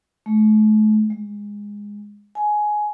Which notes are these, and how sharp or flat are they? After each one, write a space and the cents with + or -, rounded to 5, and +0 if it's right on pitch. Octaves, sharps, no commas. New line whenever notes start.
A3 -40
G#3 -15
G#5 +15